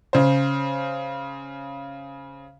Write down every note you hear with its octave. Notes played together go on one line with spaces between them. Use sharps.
C#3 C5